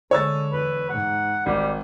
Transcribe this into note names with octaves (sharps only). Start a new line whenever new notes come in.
D3 G#3 C#5 E6 A6
E2 B4
G#2 F#5
G#1 G3